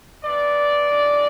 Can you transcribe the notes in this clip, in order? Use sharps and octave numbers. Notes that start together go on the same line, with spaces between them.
E3 B3 D4 D5
F#2 E3 G#3 D4